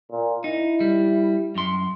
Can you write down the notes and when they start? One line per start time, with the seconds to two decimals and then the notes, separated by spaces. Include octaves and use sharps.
0.11 A#2
0.44 D#4 E4
0.80 G3
1.55 F#2 C6